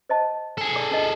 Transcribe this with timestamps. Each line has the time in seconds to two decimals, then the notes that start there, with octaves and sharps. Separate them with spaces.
0.09 C5 D#5 A5
0.58 G#4 A4
0.76 D5 D6
0.91 D4 D#5